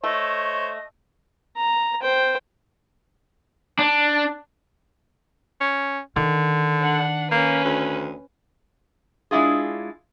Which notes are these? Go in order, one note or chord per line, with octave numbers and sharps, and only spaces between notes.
A3 C5 C#5 D#5
A#5
C5 G5
D4
C#4
D3 D#3
D4 F#5
A#3 C#4 B4
D2
G#3 D4 E4 F4 G#4